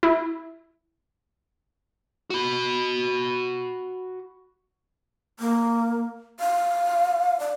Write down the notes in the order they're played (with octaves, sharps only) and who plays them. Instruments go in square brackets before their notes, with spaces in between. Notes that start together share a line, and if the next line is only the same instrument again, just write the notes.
[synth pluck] E4
[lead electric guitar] F#4 B5
[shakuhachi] A#3
F5
D5